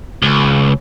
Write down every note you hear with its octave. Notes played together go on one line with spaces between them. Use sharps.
C#2